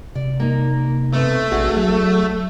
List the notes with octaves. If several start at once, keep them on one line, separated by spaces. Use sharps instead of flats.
C3 D5
A#3 D#4
B2 A3 C4
A#1 D4 F#4 G#4
F#3